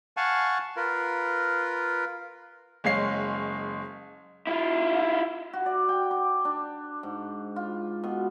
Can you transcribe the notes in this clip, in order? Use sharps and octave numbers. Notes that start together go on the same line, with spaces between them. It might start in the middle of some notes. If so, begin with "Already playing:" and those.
F5 F#5 G#5 A5 C#6
F4 A#4 B4
F#1 G#3 C#5 F5 C7
E4 F4
F#4
D5
G5
D6
D4
G#2
F4
B2